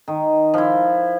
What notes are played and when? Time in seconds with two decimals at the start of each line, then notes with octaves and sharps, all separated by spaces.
0.08 D#3
0.54 F3 E4